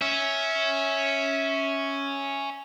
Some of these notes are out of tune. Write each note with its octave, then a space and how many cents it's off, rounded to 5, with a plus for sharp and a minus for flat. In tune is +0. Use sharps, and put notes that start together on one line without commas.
C#4 +0 E5 -15